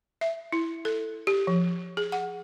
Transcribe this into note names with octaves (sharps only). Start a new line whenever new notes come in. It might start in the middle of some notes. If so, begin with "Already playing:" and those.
E5
E4
A4
G4
F3
G#4
F#5